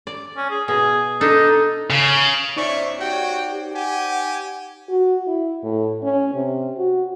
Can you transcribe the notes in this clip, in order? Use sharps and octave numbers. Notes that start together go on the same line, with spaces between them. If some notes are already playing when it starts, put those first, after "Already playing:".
D5
C#4
G#4
B2 G#4
D4 D#4 A4
C#3
C#4 D#4 C5 D5 E5 C#6
F#4 G4 C#5 G5
G4 F#5 G#5
F#4
E4
A2
C#4
C3
F#4